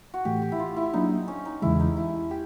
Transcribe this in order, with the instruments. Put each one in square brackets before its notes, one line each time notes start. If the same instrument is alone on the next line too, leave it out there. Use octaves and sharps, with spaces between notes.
[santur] F#4
[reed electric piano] A2 E3 A3 [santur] G4
[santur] G4
E4
F4
E4
[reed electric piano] F#3 A#3 D4 [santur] D#4
[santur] C#4
D#4
[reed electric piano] E2 C#3 E3 G#3 [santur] E4
[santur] D#4
E4
G4